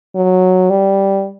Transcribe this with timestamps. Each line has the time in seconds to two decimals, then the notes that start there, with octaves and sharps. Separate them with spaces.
0.15 F#3
0.70 G3